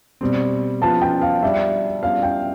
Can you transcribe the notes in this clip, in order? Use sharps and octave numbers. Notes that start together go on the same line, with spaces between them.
B2 G3 C4
F3 B3 F4 A5
G5
F5
G3 D4 G4 E5
G3 B3 D4 F4 F5
G5